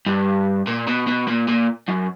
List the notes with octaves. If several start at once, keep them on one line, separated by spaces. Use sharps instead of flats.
G2
A#2
B2
B2
A#2
A#2
F#2